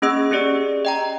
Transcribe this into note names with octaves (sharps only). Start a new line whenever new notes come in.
A#3 C#4 G#4 D#5 E6
C#4 G4 G#4 D5
D#5 G5 A#5